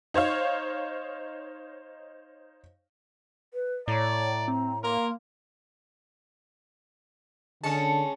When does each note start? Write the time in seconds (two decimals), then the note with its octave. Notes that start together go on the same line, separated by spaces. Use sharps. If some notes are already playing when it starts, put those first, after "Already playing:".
0.14 D#4 C5 C#5 F5
3.54 B4
3.88 A2 C#5 D5 A#5
4.48 C4
4.84 A#3 A#4 C6
7.63 D3 G#3 C#4 A5 C#7